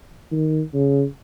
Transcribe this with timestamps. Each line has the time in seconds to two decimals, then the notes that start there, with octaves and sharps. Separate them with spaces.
0.31 D#3
0.74 C#3